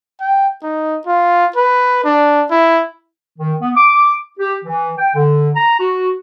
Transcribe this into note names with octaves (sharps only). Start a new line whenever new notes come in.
G5
D#4
F4
B4
D4
E4
D#3
B3
D6
G4
E3
G5
D3
A#5
F#4